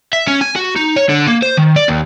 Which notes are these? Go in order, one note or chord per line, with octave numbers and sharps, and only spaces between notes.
E5
C#4
G#5
F#4
D#4
C#5
D3
A#3
C5
D#3
D5
D#2